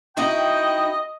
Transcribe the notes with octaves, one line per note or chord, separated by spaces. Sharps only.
D#4 E4 F#4 D#5 G5